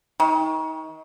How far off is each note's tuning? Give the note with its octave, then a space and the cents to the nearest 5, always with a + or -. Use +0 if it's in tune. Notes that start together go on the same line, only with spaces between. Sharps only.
D#3 +30